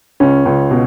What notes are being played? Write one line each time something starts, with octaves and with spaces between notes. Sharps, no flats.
C#2 C#4
C#2
B2